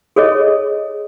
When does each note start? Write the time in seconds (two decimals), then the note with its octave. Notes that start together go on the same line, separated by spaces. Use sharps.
0.16 G#4 A4 C#5 D#5